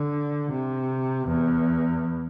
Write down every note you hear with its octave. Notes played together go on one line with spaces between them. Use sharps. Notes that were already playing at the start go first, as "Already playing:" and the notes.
Already playing: D3
C3
E2